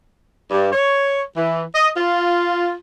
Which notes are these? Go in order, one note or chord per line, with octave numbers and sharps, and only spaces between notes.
G2
C#5
E3
D#5
F4